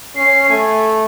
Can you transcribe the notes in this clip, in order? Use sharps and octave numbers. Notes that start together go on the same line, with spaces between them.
C#4 C7
A3 G#5